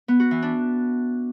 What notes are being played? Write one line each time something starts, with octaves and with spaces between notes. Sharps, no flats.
B3
F#4
E3
D4